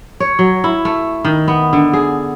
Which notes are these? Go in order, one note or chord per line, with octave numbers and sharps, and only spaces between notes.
C#5
F#3
E4
A3
D#3
B3
D3
G#4